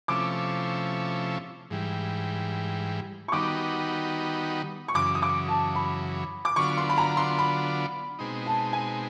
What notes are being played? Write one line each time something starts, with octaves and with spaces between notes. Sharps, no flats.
C3 F3 A3 C#4 E4 D6
G#2 E3 G3
C#6
D#3 G3 B3 D#4 F#4 D6
C#6
F#2 C#3 E3 D6
D#6
D6
A5
B5
D6
D3 F#3 B3 D4 F4 C#6
C6
B5
A#5
C6
B5
B2 G#3 C4 D#4
A5
G#5